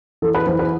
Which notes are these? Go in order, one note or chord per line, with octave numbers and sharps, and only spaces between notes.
E3 A4
B4
E3 C5
B4